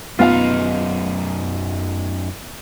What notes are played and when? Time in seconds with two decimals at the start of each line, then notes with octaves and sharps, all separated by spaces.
0.19 F#2 B3 D#4 F4 F5